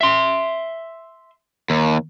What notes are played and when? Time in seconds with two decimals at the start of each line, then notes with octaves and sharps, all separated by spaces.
0.01 E5 C6
1.70 D#2